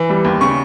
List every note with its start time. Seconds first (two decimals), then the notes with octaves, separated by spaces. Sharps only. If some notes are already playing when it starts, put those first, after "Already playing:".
Already playing: E3
0.09 G3
0.25 D#2
0.41 C#3 C#6